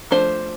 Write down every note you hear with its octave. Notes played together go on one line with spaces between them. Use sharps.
F3 A3 D4 C5